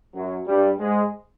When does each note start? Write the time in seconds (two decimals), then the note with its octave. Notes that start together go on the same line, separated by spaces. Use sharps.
0.14 F#2 F#3
0.46 G2 G3
0.79 G#2 G#3